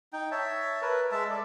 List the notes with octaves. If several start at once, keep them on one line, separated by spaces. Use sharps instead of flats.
D#4 G5
C#5 E5 A5
A#4 B4
G#3 E5 A5
A4 D5